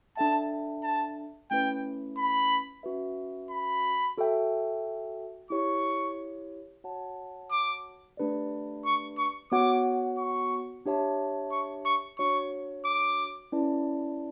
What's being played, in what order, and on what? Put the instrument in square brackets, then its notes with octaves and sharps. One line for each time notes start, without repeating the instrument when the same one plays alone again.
[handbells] D4 A4 E5 G5 [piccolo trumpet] A5
[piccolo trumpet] A5
[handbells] A3 C#4 E4 B4 [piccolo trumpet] G5
[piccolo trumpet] B5
[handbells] C#4 F#4 B4 E5
[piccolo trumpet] B5
[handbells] F#4 A4 E5 G5
[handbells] E4 G4 C#5 [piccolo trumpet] C#6
[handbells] F#4 C#5 F#5 A5
[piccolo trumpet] D6
[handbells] A3 D4 G4 B4 D5
[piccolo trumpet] C#6
C#6
[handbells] B3 F#4 C#5 F#5 [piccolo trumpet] D6
[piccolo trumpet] C#6
[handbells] D4 G4 C#5 E5 A5
[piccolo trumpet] C#6
C#6
[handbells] D4 F#4 C#5 [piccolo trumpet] C#6
[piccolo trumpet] D6
[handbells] C#4 E4 B4 D5 A5